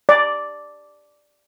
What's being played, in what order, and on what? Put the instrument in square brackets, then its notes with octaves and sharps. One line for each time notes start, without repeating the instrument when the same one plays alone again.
[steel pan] D5